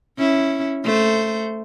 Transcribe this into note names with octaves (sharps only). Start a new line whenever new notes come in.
C#4 E4
A3 C5